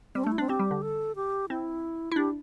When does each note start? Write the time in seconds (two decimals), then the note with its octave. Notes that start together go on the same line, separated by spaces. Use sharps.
0.15 G3 C4
0.24 D4
0.26 A3
0.32 E4
0.38 C4 D4
0.49 C4 G4
0.59 G3
0.71 D3
0.82 A4
1.16 G4
1.49 C4 E4
2.12 E4
2.16 D4 G4